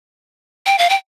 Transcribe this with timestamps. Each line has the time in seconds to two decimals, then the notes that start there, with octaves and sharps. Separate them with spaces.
0.66 G5
0.79 F5
0.90 G5